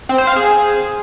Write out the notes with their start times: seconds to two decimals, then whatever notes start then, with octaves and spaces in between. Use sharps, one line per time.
0.09 C4
0.18 C5
0.27 F5
0.36 G#4